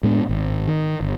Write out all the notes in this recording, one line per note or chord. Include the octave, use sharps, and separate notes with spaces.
A2 G#3 B3 D4
G#1
D#3
G1